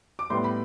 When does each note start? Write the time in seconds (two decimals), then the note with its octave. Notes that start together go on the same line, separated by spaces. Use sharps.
0.19 D6
0.30 A2 G3 B3 C6
0.44 B5